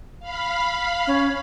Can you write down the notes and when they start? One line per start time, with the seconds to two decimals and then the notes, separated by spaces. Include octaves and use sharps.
0.20 F5 B5
1.07 C#4